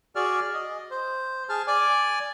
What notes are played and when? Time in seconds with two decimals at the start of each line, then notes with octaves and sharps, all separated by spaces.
0.15 F#4 G#4 D5 F6
0.54 D#5
0.91 C5
1.49 G#4 A5 F6
1.67 D5 G#5 D6